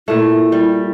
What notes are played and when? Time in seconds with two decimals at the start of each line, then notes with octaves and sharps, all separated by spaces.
0.08 A#2 A3 E4
0.52 G3